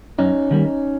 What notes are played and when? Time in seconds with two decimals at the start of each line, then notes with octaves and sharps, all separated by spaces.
0.19 F#2 C#4 D#4
0.51 D#3 G3 A#3